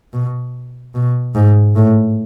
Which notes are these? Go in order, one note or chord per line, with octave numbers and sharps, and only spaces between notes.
B2
B2
G#2
A2